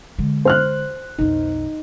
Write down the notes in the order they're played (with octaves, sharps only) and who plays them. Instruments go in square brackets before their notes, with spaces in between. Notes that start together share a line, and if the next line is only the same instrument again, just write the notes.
[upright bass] D3 G#3
[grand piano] C5 F6 F#6
[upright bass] B1 F2 [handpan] D#4